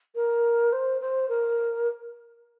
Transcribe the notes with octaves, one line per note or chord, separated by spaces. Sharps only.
A#4
C5
C5
A#4